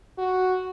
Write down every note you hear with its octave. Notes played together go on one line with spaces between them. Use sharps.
F#4